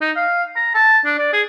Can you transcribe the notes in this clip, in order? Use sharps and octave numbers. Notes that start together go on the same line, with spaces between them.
D#4
F5
A#5
A5
D4
D5
G#4